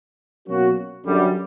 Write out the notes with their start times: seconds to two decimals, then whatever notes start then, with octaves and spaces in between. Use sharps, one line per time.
0.48 B2 F#3 A#3 C#4 F#4
1.05 F#2 D3 G3